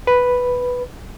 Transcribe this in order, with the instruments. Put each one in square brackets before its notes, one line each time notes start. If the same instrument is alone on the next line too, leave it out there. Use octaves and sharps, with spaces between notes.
[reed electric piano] B4